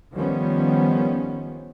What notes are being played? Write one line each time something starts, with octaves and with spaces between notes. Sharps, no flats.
D#3 F3 G3 B3 C#4